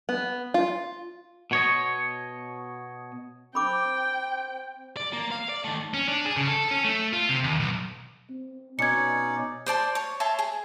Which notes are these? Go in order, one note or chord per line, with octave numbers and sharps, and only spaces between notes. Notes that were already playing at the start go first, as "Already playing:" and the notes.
B3
F4
B2 C#5 D#5
C4 G5 B5 D6
D5
A#3
F5
D5
D#3 A3
C#4
D4
G#4
C#3
A4
C#4
A3
F4
C3
D#2
B1
C4
B2 C#4 D#4 D5 G#6 C#7
C5 D5 A5 C6
C#5
C#5 E5 A5 C6
G#4